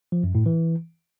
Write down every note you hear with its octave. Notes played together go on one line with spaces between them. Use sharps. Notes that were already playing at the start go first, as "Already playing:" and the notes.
F3
F#2
A2
E3